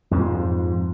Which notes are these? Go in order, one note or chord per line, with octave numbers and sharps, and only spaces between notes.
F2 G#2 F3